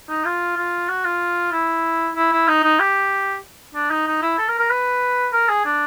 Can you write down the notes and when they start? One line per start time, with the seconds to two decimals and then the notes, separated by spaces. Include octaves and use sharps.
0.09 D#4
0.25 F4
0.57 F4
0.89 F#4
1.05 F4
1.52 E4
2.15 E4
2.32 E4
2.48 D#4
2.64 D#4
2.80 G4
3.75 D4
3.90 D#4
4.07 D#4
4.22 E4
4.39 A4
4.48 A#4
4.59 A#4
4.70 B4
5.33 A#4
5.49 G#4
5.65 D4